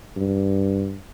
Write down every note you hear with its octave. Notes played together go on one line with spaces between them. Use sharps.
G2